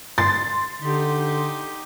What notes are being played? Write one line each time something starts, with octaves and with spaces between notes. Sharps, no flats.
C6 A6
D3 D#4 G4